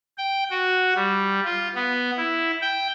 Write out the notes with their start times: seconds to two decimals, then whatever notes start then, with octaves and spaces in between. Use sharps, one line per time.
0.18 G5
0.50 F#4
0.96 G3
1.45 F4
1.75 B3
2.18 E4
2.62 G5